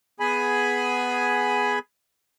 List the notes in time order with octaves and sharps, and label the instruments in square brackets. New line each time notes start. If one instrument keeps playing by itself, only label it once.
[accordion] B3 G#4 G#5 B5